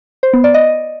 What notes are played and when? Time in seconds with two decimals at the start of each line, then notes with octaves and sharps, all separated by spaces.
0.23 C5
0.33 B3
0.44 D5
0.54 D#5